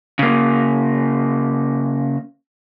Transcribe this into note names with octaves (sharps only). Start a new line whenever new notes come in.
C#3 A#3